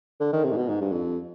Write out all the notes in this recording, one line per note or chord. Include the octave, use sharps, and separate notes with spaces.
D3
D#3
C3
G#2
B2
G#2
G2
F2